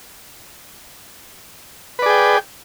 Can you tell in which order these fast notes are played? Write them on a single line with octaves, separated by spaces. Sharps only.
B4 D5 G#4 G5